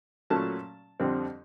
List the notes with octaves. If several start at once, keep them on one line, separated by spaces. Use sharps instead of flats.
A#2 F#3 A3 C#4 A5
F2 D3 G3 C4